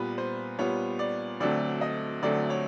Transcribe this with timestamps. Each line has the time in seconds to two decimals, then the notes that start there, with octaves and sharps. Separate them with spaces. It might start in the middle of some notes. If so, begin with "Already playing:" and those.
Already playing: A#2 G3 B3 B4
0.18 C5
0.59 A#2 G3 B3 C#5
0.99 D5
1.40 D2 D3 F#3 A3 C4 D5
1.81 D#5
2.23 D2 D3 F#3 A3 C4 D5
2.50 C#5